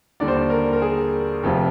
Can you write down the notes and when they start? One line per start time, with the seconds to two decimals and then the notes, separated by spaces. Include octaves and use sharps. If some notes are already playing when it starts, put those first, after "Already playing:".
0.20 D#2 D3 G3 D5
0.28 C5
0.36 D5
0.50 A#4
0.73 A#4
0.82 G#4
1.43 F1 F2 C3 F3